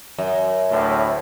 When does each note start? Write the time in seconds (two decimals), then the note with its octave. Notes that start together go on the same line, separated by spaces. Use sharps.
0.19 F#2
0.71 D2 A2